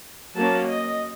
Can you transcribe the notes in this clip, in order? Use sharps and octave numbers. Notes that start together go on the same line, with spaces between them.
F#3 A#3 C#4 A5
D#5